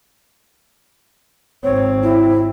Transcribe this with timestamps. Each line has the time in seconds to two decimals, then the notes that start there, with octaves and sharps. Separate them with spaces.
1.64 G#1 C4 C#5
2.03 E4